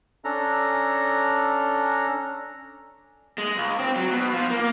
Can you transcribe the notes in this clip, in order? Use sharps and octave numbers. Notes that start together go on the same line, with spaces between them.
C#4 D4 A4 A#5
G#3
C#2
C4
F#3
B2
F3
A#3